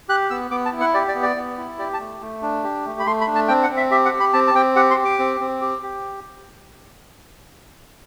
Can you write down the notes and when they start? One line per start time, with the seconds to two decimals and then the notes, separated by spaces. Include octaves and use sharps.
0.09 G4 F#6
0.30 B3 E6
0.51 B3 D6
0.65 A5
0.73 E4
0.80 F#5
0.94 G4 D5
1.08 D5
1.15 B3
1.22 D5
1.36 B3
1.58 E4
1.78 G4 D5
1.94 A5
2.00 A3
2.21 A3
2.42 D4
2.64 G4
2.86 A3
3.00 B5
3.06 A3 C6
3.21 B5
3.27 D4
3.35 A5
3.48 C4 G5
3.63 F#5
3.70 C4
3.77 E5
3.91 G4 E5
4.05 F#5
4.13 G4
4.20 B5
4.33 C4 A5
4.47 A5
4.54 C4 G5
4.76 G4 F#5
4.91 C6
4.97 G4
5.05 D6
5.19 C4
5.40 C4
5.61 G4
5.82 G4